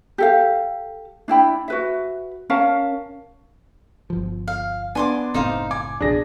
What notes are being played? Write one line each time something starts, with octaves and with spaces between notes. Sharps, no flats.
G4 A4 F5
D4 E4 G5 B5
F#4 B4 E5
C#4 A#4 F5 A5
G1 F3
F5
B3 D4 G#5 C6 D6
F#1 A2 C4 D#4 C5 F5
G#5 D6
A1 F2 B2 D4 G#4 A#6